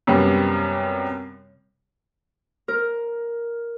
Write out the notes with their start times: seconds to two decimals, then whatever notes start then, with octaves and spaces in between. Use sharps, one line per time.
0.07 F#2 C3 G3 A#3 B3
2.68 A#4